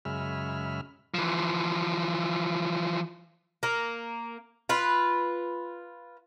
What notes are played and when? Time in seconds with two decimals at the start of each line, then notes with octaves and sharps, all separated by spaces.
0.05 F#2 C#3 G#3 E5 B5 F6
1.14 E3 F3
3.63 A#3
4.69 F4 B4